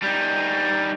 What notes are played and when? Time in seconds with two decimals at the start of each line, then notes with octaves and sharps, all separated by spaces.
0.02 G3 D#4